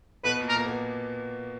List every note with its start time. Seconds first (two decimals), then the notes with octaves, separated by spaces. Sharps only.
0.24 B2 B3 B4
0.40 A#2 A#3
0.49 A#4
0.56 A#2 A#3
0.66 B3